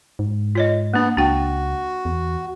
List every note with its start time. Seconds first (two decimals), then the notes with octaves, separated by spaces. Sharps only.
0.19 G#2
0.55 F4 C#5 D#5
0.94 A#3 B3 D4
1.17 C#2 D4 F#4 G5
2.05 E2